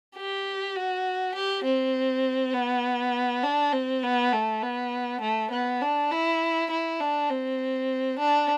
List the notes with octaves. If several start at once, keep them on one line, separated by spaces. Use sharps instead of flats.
G4
F#4
G4
C4
B3
D4
C4
B3
A3
B3
A3
B3
D4
E4
E4
D4
C4
D4